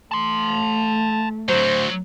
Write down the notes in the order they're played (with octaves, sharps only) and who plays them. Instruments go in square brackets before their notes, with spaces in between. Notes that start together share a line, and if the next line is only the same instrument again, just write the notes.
[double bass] A3 [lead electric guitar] A5 C6
[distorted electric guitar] D2 F#3 [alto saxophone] C5